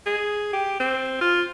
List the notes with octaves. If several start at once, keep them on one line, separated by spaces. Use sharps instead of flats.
G#4
G4
C4
F4